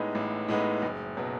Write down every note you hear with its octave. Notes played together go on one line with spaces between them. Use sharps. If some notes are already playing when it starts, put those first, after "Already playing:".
Already playing: A1 A2 G#3 B3 D#4
A1
A2 G#3 B3 D#4
F#1
B2 F#3